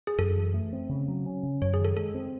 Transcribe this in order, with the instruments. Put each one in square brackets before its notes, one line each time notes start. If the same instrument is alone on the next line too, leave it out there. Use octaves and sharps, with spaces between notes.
[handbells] G#4
[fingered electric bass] F#2 [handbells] A4
[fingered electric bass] E3
A3
C4
C#3
F#3
C#4
C#3
[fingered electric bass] F#2 [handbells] C#5
[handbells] G#4
[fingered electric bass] D#3
[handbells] A4
[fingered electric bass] G#3 [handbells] A4
[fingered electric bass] C4